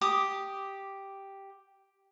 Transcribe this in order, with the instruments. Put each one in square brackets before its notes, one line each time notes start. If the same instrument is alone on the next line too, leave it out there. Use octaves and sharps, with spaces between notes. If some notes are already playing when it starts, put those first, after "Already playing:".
[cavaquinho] G4 D6 D#6